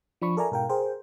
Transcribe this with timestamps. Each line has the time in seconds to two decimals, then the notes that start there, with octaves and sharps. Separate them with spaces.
0.21 F3 D4 B5 C#6
0.37 A4 A#4 D5 E5 G#5 A#5
0.52 G#2 B2 A#4 F5 G5
0.69 G#4 A#4 C5 G5